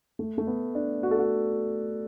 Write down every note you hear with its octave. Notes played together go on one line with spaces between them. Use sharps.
A3
A3
B3
D4
F#4
A4
F#4